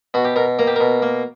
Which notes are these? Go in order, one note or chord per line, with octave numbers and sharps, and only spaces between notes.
B2 F#4
G4
B2 A#4
A#3 A#4
G4
B2 A#4
A#3